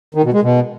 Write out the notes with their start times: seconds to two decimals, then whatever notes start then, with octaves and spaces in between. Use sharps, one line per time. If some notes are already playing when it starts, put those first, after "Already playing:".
0.15 D#3
0.24 B2
0.33 G#3
0.43 B2